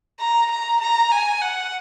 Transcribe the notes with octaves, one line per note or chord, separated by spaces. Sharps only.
A#5
A#5
A#5
G#5
F#5